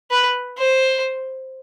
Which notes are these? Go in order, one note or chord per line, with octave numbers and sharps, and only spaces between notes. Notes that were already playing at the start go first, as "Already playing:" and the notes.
B4
C5